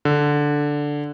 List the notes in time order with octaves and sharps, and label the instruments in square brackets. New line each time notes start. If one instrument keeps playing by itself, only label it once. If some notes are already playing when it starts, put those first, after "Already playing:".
[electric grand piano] D3